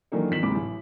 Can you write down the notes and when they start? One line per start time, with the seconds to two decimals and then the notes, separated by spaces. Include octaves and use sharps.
0.12 D#3 E3 F#3 A3 A#3 D4
0.30 E2 D#3 F3 B6 E7 F#7
0.43 D1 G#2 C3 B5 D6
0.55 A1